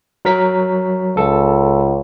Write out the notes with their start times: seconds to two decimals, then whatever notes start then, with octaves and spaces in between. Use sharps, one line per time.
0.25 F#3 A#4 B6
1.17 C#2 A4